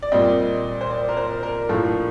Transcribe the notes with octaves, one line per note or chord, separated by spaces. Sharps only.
D5
A#2 G3 C4 D#5
C5
D5
A#4
C5
A#4
A2 F3 A#3 D4 A4